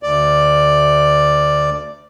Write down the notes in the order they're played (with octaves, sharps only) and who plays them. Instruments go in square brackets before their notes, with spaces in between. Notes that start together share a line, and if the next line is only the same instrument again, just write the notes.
[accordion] D2 D5